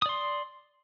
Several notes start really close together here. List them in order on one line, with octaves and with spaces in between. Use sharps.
D#6 D5 C6